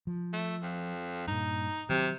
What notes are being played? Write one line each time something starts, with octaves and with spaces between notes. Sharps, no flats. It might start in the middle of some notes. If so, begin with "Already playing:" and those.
F3
A3
F2
G2 A#2 D#4
C3 D#3 F#3